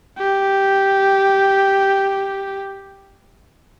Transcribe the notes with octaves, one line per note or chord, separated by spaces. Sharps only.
G4